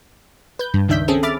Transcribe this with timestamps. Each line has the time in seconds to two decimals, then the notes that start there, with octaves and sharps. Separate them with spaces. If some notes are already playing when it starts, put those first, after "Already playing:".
0.59 B4 G6
0.74 G2
0.88 C#2 D#3 D4 E5 G6 B6
1.08 C4 C#4 G#4 A4
1.23 E5 B5 D6 F6 A6